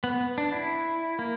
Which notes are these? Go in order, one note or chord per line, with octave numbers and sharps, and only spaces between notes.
B3
D4
E4
A#3